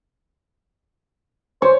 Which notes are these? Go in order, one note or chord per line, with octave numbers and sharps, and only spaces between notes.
C5 C#5